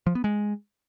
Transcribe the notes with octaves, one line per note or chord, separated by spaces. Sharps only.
F3
B3
G#3